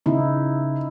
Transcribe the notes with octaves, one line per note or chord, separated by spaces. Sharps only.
C#3 D#4 E4